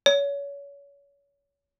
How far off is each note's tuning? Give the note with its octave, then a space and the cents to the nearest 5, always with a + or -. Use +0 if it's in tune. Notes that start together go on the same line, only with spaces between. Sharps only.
C#5 +30